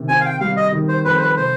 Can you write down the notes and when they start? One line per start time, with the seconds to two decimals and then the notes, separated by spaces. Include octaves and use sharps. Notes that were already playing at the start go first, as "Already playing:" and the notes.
Already playing: C3 D#3
0.08 C4 G#5
0.21 F5
0.25 G5
0.40 G3 F5
0.57 D#5
0.72 D#3
0.89 C5
1.05 F2 B4
1.16 C5
1.21 B4
1.37 C3 C5